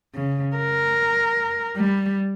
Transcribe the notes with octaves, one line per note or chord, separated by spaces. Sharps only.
C#3
A#4
G3